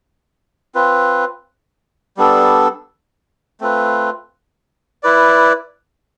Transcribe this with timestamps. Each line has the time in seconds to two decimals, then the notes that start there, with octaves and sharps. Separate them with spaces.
0.75 C4 F4 B4
2.17 G3 B3 D4 A4
3.61 A3 C4 F4 B4
5.03 E4 B4 D5